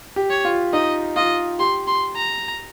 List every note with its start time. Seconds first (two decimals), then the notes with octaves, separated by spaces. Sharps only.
0.16 G4
0.30 C#5
0.45 F4
0.73 D#4 D#5
1.16 F4 D#5
1.59 G4 C6
1.87 C6
2.16 A#5